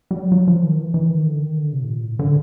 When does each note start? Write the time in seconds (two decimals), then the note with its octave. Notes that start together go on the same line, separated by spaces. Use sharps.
0.11 G3
0.16 F#3
0.32 F#3
0.48 F3
0.63 D#3
0.79 E3
0.94 E3
1.10 D#3
1.26 D3
1.41 D#3
1.57 D3
1.73 C3
1.82 A2
1.88 A#2
2.04 A2
2.19 D3